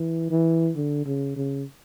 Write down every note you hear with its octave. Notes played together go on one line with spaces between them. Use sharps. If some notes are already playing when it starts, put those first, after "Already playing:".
Already playing: E3
E3
D3
C#3
C#3